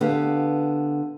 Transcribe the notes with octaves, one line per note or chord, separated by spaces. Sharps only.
D3 B3 G4 F5